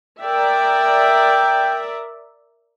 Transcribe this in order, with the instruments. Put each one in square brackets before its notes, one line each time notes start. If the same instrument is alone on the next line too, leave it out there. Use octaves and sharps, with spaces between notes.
[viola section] A#4 D5 E5 [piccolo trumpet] G5